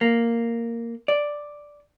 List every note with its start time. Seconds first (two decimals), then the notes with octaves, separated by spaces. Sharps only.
0.01 A#3
1.08 D5